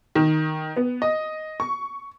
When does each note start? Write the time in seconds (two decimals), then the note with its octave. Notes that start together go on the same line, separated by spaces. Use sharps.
0.15 D#3
0.76 B3
1.02 D#5
1.60 C#6